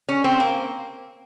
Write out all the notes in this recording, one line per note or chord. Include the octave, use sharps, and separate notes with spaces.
C#4
C4
A#3